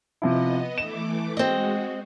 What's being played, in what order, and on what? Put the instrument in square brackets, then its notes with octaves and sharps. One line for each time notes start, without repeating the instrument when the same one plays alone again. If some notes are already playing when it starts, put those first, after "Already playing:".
[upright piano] C3 F3 E4 [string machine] B3 D#5
[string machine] E3 A3 D6 [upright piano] E7
[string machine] G#3 F#4 [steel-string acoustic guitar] C4 D#5